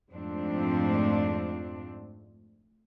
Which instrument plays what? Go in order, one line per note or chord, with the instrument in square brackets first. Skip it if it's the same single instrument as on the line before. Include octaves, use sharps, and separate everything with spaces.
[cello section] F2 G#2 F3 A3 C4 D4